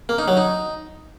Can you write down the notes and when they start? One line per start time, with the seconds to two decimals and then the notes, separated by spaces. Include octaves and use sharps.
0.09 A#3
0.18 D#4
0.28 F#3
0.37 D#4